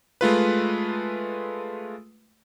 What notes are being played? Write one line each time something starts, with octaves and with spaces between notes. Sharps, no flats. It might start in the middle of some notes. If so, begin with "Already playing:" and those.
G#3 A3 F4 B4